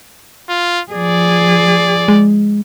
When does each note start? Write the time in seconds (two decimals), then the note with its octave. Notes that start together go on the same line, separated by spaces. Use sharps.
0.49 F4
0.92 F3 G#4 D5
2.08 G#3